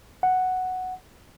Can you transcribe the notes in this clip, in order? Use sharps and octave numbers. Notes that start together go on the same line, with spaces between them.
F#5